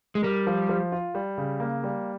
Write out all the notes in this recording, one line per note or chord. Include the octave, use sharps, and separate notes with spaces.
G#3
G3 A#4
F3
F3
F4
G3
C#3
A#3
G3